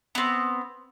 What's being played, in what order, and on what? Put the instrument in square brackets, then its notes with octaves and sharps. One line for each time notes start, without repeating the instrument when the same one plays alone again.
[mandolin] B3 C4